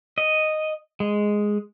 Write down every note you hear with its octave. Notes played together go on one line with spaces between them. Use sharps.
D#5
G#3